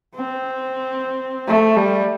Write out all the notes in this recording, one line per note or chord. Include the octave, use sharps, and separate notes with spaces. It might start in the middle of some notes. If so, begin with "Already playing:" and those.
C4
A3
G3